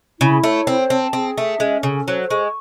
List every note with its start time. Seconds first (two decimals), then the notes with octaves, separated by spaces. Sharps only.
0.20 C#3 E4
0.43 A3 C#5
0.66 C4 C5
0.90 C4 A5
1.13 C4 G#4
1.37 A3 E5
1.60 G#3 C#4
1.83 C#3 A4
2.07 F#3 C5
2.30 G#3 C#6